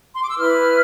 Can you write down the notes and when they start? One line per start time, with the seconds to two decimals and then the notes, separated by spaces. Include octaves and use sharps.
0.14 C6
0.22 D6
0.29 E6
0.37 E4 B4 F6